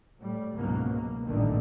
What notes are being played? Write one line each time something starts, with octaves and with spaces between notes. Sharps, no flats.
A2 G3
C#2 G#2 B2 F#3 A#3
A#3
A1 G2 A#2 D3 D#3